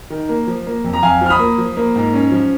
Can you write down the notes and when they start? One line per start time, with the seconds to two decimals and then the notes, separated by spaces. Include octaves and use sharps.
0.10 D#3
0.29 A#3
0.47 F3
0.67 A#3
0.84 F2
0.93 A#5
1.03 F2 F5 G#5
1.21 F3 F6
1.30 B5 D#6
1.39 A#3
1.58 F3
1.77 A#3
1.95 G#2
2.13 C#4
2.32 F3